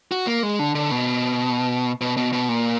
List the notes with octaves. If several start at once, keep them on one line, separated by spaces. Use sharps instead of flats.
F#4
A#3
G#3
D3
D3
B2
B2
B2
B2
A#2